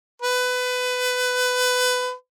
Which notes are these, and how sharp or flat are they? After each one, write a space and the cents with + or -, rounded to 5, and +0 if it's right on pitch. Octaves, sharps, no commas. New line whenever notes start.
B4 +20